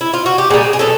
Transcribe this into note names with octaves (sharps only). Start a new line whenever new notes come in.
E4
F4
F#4
G4
A#2 G3 G#4
G#4
B2 F#3 A4